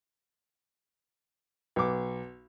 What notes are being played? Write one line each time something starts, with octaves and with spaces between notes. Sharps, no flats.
B1 D6